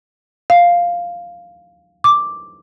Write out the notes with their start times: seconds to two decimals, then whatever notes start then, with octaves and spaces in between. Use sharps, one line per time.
0.50 F5
2.04 D6